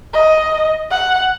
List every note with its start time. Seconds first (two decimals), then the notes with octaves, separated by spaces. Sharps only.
0.14 D#5
0.91 F#5